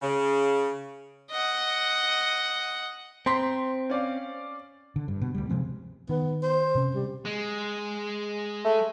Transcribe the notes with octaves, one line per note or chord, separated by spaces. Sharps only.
C#3
D#5 F#5
C4 A#5 C6 B6
C#4 D5 F5
D3
G2
B2
D2 G3
C3 F3 G#3 C4
D#3 B3
C5
C3 C#4
G3
G#3
A3